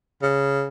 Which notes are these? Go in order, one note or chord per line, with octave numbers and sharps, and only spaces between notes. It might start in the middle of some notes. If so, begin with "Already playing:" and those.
C#3